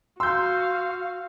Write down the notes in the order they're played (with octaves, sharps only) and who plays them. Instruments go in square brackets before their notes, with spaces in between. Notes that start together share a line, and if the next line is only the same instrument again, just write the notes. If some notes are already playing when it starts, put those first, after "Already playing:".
[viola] F#4 F5 [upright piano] C6 [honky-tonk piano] E6 G6